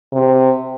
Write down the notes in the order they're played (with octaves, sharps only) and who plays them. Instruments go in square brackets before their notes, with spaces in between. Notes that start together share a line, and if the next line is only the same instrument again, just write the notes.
[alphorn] C3